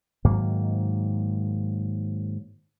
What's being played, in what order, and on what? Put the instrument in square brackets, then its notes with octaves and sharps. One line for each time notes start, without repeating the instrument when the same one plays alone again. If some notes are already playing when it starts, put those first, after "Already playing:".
[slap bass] G#2 D#3 F#3 A#3